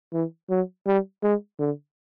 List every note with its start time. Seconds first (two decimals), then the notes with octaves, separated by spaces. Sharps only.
0.13 E3
0.50 F#3
0.86 G3
1.23 G#3
1.59 D3